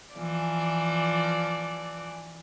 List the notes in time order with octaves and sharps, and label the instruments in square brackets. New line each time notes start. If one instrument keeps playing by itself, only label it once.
[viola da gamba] E3 F3 D5